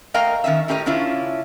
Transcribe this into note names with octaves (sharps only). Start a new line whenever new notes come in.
A3 A#4 D#5 F5 G5 A#5
D#3 C#4 D#5 E5
A2 C#4 G4 A#4 D#5
C#3 C#4 D4 E4 F4